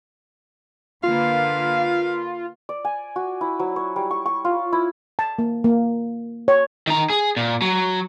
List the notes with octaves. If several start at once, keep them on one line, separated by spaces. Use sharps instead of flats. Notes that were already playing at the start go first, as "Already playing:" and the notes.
D3 A#3 F4 B4 F5
D5
G#5
F#4
E4
F#3
C#5
G3
C#6
C#6
F4
E4
A5
A#3
A#3
C#5
D#3 A#5
G#4
A#2
F#3